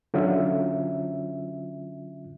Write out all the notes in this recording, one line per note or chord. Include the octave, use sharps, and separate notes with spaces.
D3 F#3 C#4 F4 E5